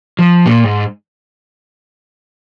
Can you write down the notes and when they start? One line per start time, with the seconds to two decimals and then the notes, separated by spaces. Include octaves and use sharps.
0.19 F3
0.46 A#2
0.64 G#2